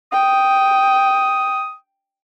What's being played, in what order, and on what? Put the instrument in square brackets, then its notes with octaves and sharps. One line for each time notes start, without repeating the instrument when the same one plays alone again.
[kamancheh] G5 [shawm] D#6